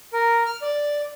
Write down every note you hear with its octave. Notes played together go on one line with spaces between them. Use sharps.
A#4
F6
D5